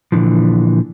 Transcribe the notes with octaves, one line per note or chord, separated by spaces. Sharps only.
A#2 D3 E3 F3